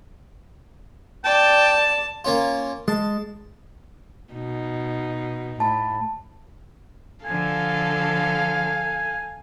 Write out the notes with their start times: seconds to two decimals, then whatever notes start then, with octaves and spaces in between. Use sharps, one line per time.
1.25 D5 G5 A5
2.24 A#3 C#4 F4
2.88 G#3 A5
4.34 B2 D#4
5.60 A2 A5 B5
7.25 D3 F3 A4 F5 G#5